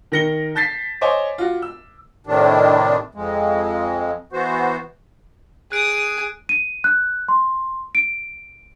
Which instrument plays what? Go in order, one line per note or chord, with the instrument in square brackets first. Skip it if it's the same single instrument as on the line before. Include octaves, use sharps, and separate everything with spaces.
[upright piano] D#3 A#4 A#6 C#7 G7
A5 G6 A6 B6 C7
C5 C#5 D#5 G#5 D6
F4 F#4
E6
[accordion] A2 C3 D#3 D4
F2 G#3
E3 B3 F#4 C5
[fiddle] G#4 D#6 [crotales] F#6 D7
[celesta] D#7
F#6
C6
D7